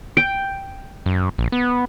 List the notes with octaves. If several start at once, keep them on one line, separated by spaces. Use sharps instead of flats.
G5
F#2
A#1
B3